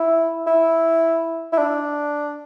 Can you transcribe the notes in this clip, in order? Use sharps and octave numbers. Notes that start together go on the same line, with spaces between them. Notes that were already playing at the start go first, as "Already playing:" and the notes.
Already playing: E4
E4
E4
D4